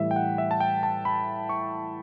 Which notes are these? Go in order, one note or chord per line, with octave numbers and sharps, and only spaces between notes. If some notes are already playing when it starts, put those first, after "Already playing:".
Already playing: A2 E3 G3 E5
G5
F#5
E5
A5
G5
A5
B5
C#6